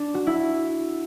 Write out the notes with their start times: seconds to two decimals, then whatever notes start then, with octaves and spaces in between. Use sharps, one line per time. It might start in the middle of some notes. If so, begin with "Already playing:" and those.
Already playing: D4
0.14 F#4
0.27 E4